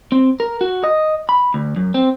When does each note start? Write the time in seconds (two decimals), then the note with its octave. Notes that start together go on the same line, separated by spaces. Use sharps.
0.12 C4
0.40 A#4
0.61 F#4
0.84 D#5
1.29 B5
1.54 D2
1.76 F#2
1.94 C4